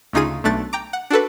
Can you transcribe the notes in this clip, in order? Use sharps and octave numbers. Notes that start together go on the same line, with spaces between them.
D2 C#3 D#4 F4 G#4 D#7
B1 A3 D4 F#6 A6
G5 A#5 D6
F#5
D4 F#4 A4 B4